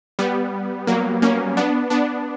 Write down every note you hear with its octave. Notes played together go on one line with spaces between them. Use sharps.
G3 B3
F#3 A#3
A#3 C#4
B3 D4
B3 D4